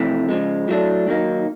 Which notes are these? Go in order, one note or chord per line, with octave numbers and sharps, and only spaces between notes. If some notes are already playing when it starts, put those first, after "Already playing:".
Already playing: F2 C3 E3 A3
C#3 F3 G#3
A2 F#3 A3 D4
D#3 F#3 A#3 D#4